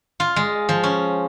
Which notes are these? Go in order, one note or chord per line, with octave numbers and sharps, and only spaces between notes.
F4
G#3
F3
C#4